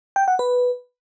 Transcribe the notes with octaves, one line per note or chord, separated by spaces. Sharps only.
G5
F#5
B4